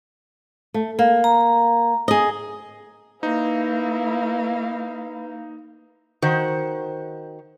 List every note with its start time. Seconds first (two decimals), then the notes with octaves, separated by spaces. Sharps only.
0.74 A3
0.99 A#3
1.24 A#5
2.08 G#4 D#5
3.23 A#3 D#4 E4 B4 F5
6.22 D#3 F#4 C5